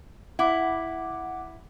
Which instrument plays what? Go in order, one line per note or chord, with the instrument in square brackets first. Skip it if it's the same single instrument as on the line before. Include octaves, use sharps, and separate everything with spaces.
[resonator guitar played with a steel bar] E4 [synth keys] F#5 D6